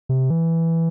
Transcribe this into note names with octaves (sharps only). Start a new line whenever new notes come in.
C3
E3